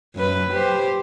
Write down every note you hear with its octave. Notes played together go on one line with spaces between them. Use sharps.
F#2 B4
G4 C5